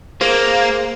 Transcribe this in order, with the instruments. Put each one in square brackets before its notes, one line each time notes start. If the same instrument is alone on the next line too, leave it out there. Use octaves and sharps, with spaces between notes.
[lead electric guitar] A#3 [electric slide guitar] G#4 A#4 C5